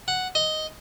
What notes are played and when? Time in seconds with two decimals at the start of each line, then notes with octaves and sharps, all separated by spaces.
0.08 F#5
0.35 D#5